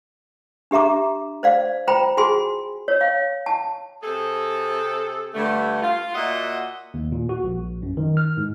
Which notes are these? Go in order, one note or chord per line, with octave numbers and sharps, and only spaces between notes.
D4 G4 E5 A#5 D6
C5 D5 F5
F4 C5 G5 A#5 B5
F4 F#4 G#4 G#5 C6
C#5
F5
A5
C3 G#4 A4
G2 D3 A3
F4
A#2 F#4 D#5 E5 F#5
D#2
A#2
F#4
A#1
F#2
D#3
F6
G#2